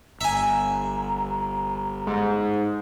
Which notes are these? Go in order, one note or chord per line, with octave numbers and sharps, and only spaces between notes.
G1 E5 G#5 A#5
G#2